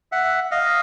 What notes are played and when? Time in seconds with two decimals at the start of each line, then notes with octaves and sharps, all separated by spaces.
0.12 E5 F#5
0.51 D#5 F5